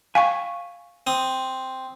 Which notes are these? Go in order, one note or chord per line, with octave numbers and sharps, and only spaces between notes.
F5 G5 G#5 C#6
C4 D#6